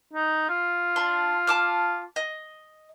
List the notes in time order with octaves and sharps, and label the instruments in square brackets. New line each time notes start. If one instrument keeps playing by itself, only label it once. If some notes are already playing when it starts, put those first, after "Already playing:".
[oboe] D#4
F4
[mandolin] D4 C6
A5 D6 F6
D#5